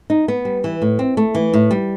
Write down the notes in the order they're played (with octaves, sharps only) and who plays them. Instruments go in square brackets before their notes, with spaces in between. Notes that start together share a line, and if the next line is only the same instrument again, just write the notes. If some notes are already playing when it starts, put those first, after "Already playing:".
[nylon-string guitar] D#4
B3
G3
E3
A2
C4
A3
E3
A2
G3